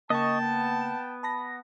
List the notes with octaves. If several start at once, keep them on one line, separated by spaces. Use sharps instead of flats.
C#3 A#3 D#5 G5 A5 C#6
B3
A5 B5 A#6